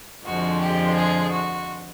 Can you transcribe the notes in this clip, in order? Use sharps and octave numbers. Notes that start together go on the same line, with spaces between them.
F2 D3 F3 G#3 F#4
G4
G#4
F#4